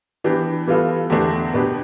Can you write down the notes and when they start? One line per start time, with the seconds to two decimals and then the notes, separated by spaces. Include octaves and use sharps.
0.24 E3 B3 D4 G4
0.67 E3 G3 B3 F4 A4
1.10 E2 D3 A3 D4 G4
1.53 B2 B3 D4 G4